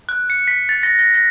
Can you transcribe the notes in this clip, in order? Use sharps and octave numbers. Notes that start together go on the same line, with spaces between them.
F#6
C#7
B6
A6
A#6
A#6
A#6